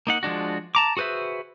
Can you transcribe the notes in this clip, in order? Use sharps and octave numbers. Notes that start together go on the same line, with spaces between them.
A#3 D#4 F#5
F3 G#3 D4 F#4
A5 A#5 D6
F#4 G#4 B4 C5 E5